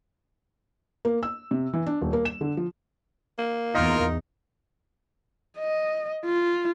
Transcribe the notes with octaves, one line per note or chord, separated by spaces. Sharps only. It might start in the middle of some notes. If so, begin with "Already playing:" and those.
A#3
E6
C3
E3
D4
D#1
A#3
E7
D3
F3
A#3
E2 D#4 F4 A#4
D#5
F4